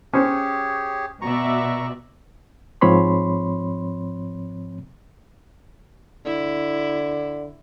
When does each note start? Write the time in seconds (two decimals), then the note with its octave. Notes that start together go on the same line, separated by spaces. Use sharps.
0.13 C#4 G4 G#4 C5 C#5
1.22 B2 F#4 D5 E5 A#5 C#6
2.81 G#2 F3 C4 C#5 B5 C6
6.26 D3 E4